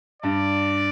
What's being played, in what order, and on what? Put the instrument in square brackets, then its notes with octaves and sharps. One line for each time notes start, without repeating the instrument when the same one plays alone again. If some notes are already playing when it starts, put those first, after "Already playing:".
[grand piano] G2 [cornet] D5